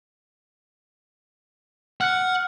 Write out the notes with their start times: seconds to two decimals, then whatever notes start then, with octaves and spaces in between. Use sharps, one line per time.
2.01 F#5 F6 F#6 C#7